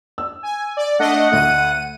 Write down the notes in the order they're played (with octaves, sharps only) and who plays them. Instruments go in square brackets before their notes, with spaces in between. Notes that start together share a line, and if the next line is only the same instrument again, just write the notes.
[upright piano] E6
[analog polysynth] G#5
D5
[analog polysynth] A3 D4 D#5 [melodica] F#5
[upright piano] D2 A3 [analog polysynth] D#7